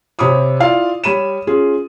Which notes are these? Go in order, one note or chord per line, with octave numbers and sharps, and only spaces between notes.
C3 C#5 B5 D6 D#6
E4 F4 D5 F5
G3 C#5 B5 D#7 E7
C#4 F4 G#4